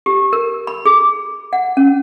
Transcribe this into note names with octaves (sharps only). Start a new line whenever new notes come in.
G4
A#4
B5
G#4
F#5
C#4